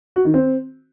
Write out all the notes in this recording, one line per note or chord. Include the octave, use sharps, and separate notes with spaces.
F#4
D#3
C4